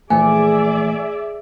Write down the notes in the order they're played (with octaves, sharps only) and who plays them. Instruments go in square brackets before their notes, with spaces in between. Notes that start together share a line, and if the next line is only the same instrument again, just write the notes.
[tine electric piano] A#1 E3 A3 [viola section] G#4 D5 E5 [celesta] G#5